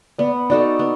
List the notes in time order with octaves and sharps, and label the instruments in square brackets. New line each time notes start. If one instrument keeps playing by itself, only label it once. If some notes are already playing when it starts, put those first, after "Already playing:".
[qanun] B3 [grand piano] D5
[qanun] D#4 F#4 A4 [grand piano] D5
[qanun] B3